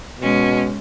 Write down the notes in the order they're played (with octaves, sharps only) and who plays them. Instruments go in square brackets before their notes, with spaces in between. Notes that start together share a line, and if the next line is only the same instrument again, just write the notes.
[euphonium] B2 [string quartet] G#3 C#4